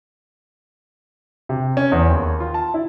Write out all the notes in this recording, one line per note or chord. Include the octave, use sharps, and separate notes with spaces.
C3
C#4
E2
D#2
F4
A5
E4